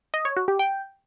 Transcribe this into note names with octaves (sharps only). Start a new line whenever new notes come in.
D#5
C#5
F#4
G4
G5